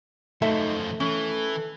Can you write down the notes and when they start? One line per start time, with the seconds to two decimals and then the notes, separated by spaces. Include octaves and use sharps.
0.42 F#2 F3 A3 D#4 E5
1.00 E3 C#4 A4